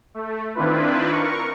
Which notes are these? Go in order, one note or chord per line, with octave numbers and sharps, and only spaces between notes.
A3
D#3 C4 D4 E4 F4 B4
A#4 C#6